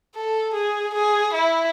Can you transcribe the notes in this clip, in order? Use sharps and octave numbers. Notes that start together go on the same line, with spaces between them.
A4
G#4
G#4
E4